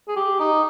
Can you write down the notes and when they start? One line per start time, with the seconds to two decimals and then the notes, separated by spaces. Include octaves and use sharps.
0.08 G#4
0.16 G4
0.40 D#4